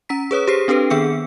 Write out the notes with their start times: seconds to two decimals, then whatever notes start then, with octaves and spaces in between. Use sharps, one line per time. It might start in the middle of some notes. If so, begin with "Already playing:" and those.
0.09 C#4 A#5 B6
0.31 G#4 B4 C#5 D#6
0.47 G4 G#4 C5 C7
0.68 C4 D4 G4 A4 B4
0.90 D#3 B3 G#4 G5 E6 C#7